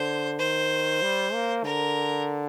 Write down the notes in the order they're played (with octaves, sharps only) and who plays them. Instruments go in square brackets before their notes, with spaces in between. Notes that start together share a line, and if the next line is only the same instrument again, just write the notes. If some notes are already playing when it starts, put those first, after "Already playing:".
Already playing: [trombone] D3 [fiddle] C5
[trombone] D#3 [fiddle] C5
[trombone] G3
A#3
[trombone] D3 [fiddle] A#4